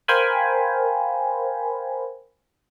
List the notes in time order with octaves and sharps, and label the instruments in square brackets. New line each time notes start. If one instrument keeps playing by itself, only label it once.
[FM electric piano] A#4 C5 F5 G5 G#5 B5